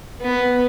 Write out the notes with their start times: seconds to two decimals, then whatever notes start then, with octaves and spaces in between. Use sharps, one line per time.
0.22 B3